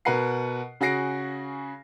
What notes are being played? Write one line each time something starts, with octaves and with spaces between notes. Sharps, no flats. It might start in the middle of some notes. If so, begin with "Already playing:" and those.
B2 A#4 B4 F#5 C7
C#3 F#4 G#4 A#6 C7 D7